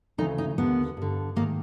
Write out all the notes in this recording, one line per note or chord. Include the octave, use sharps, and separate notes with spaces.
D2 C#3 E3 D#4
D#4
D#2 D3 B3
G2 D3
G#2 D#3 A#3